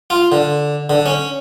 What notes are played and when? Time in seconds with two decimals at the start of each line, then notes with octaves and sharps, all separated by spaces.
0.10 F4
0.32 D3
0.90 D3
1.06 C#4